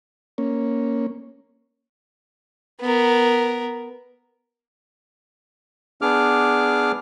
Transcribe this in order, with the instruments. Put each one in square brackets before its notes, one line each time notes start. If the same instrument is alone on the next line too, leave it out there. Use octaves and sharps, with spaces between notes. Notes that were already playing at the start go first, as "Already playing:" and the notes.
[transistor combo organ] A#3 C#4
[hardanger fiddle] B3 A#4
[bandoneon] B3 D4 G#4 D6 F6